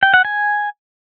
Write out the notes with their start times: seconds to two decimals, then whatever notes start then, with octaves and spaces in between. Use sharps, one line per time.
0.03 G5
0.14 F#5
0.25 G#5